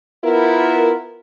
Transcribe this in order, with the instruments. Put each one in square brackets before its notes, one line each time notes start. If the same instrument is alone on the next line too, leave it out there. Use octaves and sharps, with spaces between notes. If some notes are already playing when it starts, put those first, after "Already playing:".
[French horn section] B3 E4 F4 A#4